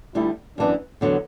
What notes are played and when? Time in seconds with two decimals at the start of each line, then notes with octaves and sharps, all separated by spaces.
0.15 D2 D3 G3 E4
0.58 F#2 E3 B3 D4
1.01 E2 D3 F#3 B3